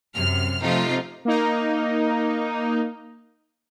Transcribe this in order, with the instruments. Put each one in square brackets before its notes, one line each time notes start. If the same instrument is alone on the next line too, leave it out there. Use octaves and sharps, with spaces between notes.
[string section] F#2 C3 F6
C3 F3 A3 D#4 F4
[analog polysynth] A#3 D#4